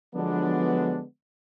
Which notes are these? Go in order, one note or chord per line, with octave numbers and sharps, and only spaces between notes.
D3 F3 F#3 G#3 B3 D4